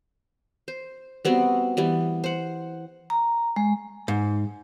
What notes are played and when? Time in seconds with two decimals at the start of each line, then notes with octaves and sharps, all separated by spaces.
0.68 C5
1.25 G3 B3 C4 F#4
1.77 E3 G3 B3
2.24 C5 F#5
3.10 A#5
3.56 G#3
4.08 G#2